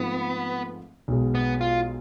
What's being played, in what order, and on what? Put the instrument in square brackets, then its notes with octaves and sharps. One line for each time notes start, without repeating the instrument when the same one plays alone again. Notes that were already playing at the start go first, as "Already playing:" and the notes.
Already playing: [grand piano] G#2 F3 A3 C4 [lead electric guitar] B3
[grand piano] B1 B2 G#3
[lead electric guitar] B3
F4